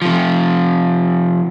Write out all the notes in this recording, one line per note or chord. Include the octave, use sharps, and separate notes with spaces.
C3 F3